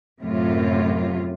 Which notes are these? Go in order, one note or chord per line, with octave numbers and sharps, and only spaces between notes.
F#2 A2 C3 F4